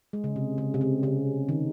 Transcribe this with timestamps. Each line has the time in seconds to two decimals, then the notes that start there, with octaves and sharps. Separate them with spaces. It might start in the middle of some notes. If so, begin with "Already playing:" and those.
0.13 G#3
0.24 C#3
0.36 C3
0.58 C#3
0.74 C3
0.81 C#3
1.03 C#3
1.49 D#3